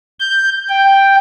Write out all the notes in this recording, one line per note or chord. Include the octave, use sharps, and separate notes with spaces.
G6
G5